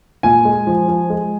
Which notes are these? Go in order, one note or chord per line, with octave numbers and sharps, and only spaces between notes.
A#2 G#5
G#3
F3
F3
G#3